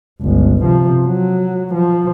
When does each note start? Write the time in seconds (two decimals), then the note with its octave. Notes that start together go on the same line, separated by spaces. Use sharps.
0.21 G1 C#2
0.62 C3 F3
1.06 F#3
1.74 F3